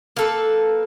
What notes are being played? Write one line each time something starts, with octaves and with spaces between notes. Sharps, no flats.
A#3 A4 B4